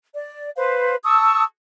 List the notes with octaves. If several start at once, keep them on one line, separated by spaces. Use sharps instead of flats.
D5
B4 C5 F5
A5 C#6 D#6 E6